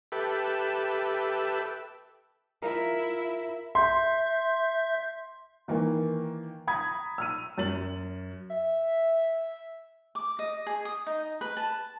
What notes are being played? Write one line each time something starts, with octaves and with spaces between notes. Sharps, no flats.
G4 A4 B4 E5
E4 F4 A#4 E5 F5
E5 C6 G6
D#3 E3 A#3
A#5 B5 D#6 G#6
E6 F6 D#7
F#2 A6 F#7
E5
D6
D#5
G#4
D#6
D#4
B4
A5